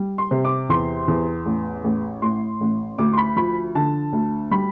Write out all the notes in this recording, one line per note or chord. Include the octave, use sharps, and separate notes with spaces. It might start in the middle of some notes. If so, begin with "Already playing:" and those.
Already playing: G3
C6
C3
D6
E2 C6
E2
A1
A1
A2 C6
A1
D2 D6
C6
B5
F3 B5
D3 A5
D2
G3 B5